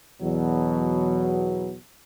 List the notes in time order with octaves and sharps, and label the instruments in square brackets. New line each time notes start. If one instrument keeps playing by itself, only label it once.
[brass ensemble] E2 B2 F#3